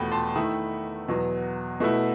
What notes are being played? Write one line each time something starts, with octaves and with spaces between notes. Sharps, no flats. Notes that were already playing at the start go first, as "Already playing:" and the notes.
Already playing: E2 B2 A3 G5 B5
A5 C6
D#3 A3 E4 B5 D#6
E2 B2 F#3
B2 A3 E4